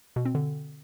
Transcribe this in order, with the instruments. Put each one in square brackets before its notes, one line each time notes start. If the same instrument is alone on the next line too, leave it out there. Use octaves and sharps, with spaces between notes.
[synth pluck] B2
C4
D3